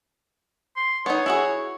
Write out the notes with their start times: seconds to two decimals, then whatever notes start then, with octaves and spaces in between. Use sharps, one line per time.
0.77 C6
1.06 B3 D#4 C#5
1.26 E4 F#4 G#4